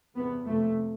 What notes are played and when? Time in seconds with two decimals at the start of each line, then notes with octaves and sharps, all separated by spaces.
0.15 E2 C3 B3
0.45 F2 C3 A3